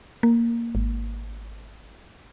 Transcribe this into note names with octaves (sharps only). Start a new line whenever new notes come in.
A#3
G#1